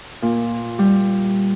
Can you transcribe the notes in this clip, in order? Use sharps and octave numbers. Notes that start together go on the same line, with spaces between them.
A#2
G3